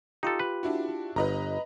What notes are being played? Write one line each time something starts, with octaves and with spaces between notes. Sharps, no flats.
D#4 F4 G4 A4
B4
D4 E4 F#4
G1 B4 D#5 A#5